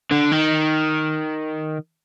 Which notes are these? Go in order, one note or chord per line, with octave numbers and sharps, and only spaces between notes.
D3
D#3